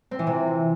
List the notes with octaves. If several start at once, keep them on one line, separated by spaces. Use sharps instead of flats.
C4
E3
C3